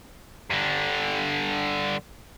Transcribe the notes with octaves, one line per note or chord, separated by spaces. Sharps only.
G2 D3